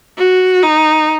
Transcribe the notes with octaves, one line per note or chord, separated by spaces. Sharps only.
F#4
D#4